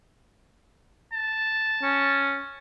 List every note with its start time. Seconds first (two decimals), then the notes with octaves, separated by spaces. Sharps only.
1.14 A5
1.82 C#4